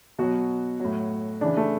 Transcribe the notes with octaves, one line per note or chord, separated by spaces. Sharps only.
B2 F#3 F#4
A2 F#3
C#3 E3 D4
A3